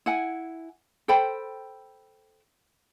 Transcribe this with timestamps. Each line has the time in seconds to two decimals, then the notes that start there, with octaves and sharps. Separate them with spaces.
0.06 E4 F#5 G#5
1.08 A4 C5 G5 B5